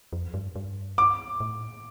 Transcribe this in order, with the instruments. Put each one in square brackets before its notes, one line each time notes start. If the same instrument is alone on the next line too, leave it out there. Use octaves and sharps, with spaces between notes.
[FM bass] F2
G2
G2
[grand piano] D6
[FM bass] A2